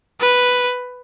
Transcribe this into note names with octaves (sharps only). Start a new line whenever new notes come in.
B4